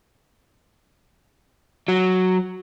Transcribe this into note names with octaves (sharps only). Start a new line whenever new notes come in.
F#3